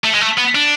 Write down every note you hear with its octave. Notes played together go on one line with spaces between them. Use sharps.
A3
G#3
A3
B3
D4